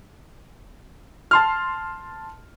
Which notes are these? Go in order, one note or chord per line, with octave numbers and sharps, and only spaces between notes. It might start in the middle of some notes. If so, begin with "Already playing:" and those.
A5 C6 F6